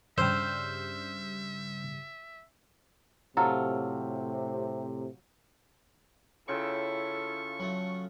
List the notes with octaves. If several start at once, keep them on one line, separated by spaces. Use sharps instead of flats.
G2 C#3 G3 C5 E5 E6 F6 G6
A2 C3 F#3 F4 A4
C#3 E4 F4 A4 G5 C#6
F#3 A3